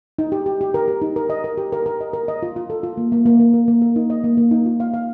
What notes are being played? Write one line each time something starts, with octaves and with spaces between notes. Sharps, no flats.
D#4
G4
G4
G4
A#4
G4
D#4
A#4
D#5
A#4
G4
A#4
A#4
D#5
A#4
D#5
F4
F4
A4
F4
A#3
A#3
A#3
A#3
A#4
A#3
A#4
D#4
D#5
A#3
A#3
D#4
F4
F5
F5